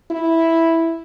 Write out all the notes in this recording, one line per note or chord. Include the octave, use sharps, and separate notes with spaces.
E4